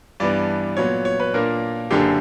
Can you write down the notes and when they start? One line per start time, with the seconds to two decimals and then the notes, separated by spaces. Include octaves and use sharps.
0.20 G2 E3 B3 D4 D5
0.77 A#2 F#3 B3 C#5
1.05 C#5
1.20 B4
1.34 A#2 A#3 D4 A#4
1.91 F#1 F#2 D3 A#3 D4 G4